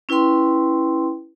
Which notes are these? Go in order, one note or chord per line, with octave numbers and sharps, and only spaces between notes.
C#4 E4 B4 G5 C6